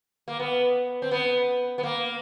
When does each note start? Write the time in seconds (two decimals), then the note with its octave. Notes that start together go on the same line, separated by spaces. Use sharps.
0.28 A#3
0.39 B3
1.02 C4
1.11 B3
1.78 B3
1.83 A#3